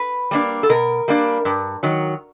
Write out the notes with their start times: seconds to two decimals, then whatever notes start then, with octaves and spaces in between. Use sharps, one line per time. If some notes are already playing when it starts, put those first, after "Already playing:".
Already playing: B4
0.31 G3 A#3 D4
0.63 A4
0.69 B2 A#4
1.08 G3 A#3 D4
1.45 G2
1.83 D#3 F#3